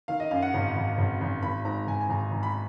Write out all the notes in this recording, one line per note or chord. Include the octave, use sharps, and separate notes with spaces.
D#3 F5
D#5
F#2 F5
F#5
G#1
G#1
G#1
G#1
G#1 B5
G#2 A#5
G#1 G#5
G#5
G#1 A#5
G#1
B5